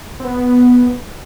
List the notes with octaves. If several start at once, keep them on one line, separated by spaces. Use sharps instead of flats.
C4
B3